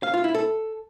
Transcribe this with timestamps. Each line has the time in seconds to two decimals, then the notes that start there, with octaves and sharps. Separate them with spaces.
0.03 F5
0.14 F4
0.24 E4
0.35 A4